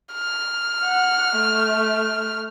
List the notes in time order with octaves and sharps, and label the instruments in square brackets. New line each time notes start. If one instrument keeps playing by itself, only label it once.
[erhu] F6
[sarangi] F#5
A3